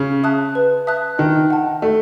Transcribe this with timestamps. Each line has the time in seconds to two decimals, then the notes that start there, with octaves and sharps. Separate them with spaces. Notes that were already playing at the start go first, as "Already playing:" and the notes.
Already playing: C#3
0.23 E5 A5 D#6 F#6
0.55 B4
0.87 E5 A5 D#6 F#6
1.18 D#3 D#5
1.50 F#5 A5
1.82 A3 D#5